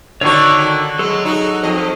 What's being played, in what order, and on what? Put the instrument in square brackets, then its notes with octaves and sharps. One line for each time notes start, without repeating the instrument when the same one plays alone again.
[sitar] D3 D#3 F#4 [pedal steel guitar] C#5 C#6
[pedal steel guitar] F#3 A4 [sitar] G#3
[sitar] D#4 F#4
F2 D#5